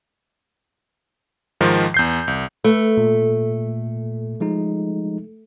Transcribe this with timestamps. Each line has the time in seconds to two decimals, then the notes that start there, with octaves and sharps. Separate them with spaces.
1.61 G#2 D#3 F3
1.94 E2 G6 C7
2.28 C2
2.64 A3 B4
2.97 A#2
4.40 F3 G#3 D#4